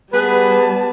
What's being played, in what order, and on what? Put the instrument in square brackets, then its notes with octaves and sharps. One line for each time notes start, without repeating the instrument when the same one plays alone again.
[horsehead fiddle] G3 A5 [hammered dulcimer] B3 [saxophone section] G#4 B4